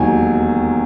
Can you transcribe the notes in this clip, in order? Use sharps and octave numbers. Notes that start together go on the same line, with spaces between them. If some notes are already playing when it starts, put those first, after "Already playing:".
Already playing: E1 D#2 D#3 F#3 G#5